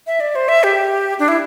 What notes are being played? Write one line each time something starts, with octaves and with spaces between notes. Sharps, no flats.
E5
D5
C5
E5
G4
D4
E4